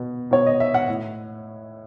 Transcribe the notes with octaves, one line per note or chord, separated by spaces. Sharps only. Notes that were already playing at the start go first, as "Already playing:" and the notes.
Already playing: B2
B2 C#5
D#5
E5
F#5
A2